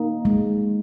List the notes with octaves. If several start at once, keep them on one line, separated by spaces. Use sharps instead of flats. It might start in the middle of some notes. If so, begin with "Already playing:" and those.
Already playing: A#3 D#4
G#3